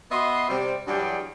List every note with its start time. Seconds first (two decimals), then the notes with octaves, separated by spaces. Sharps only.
0.11 B3 F#4 D#5 E5 C6
0.50 C3 G3 C5
0.87 G2 E3 F#3 G3 G#4 G5